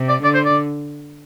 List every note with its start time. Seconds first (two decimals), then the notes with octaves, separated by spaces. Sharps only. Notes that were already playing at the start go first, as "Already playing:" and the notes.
Already playing: C3
0.09 D5
0.24 D3 D5
0.34 C5
0.45 D5